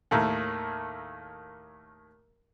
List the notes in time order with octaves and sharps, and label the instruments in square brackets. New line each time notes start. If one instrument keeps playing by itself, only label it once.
[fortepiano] D#2 A2 D#3